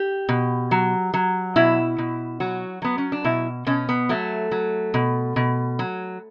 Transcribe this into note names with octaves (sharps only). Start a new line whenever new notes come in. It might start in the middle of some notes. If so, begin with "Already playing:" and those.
Already playing: G4
B2
F#3
F#3
B2 E4
B2
F#3 F#4
F#3 B3
C#4
D4
B2 E4
B2 C#4
B3
F#3 A3
F#3
B2
B2
F#3